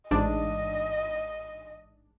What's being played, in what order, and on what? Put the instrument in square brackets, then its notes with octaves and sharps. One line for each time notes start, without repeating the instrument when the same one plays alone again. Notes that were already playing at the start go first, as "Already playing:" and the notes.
[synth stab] A1 G#2 D4 [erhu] D#5